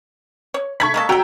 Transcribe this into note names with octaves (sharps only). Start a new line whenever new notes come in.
C#5
A3 B5 C#6 G#6 B6
G#3 A#3 A4
F#3 F#4 G5 A#5 E6